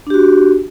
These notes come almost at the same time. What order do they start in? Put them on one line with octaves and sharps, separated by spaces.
D4 G4 F#4